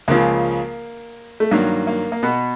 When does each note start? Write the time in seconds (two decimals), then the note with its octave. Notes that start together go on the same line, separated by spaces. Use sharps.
0.08 C#2 C#3 F3 A#3
1.40 A3
1.51 G2 D#3 F#3 A#3
1.87 A#3
2.12 A#3
2.23 B2 B3